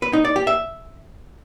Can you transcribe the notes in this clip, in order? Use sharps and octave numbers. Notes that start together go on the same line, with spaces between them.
B4
D#4
D5
G4
E5